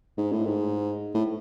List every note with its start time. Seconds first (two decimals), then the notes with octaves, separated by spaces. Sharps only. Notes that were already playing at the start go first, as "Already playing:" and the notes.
0.18 G#2
0.32 A2
0.46 G#2
1.14 A2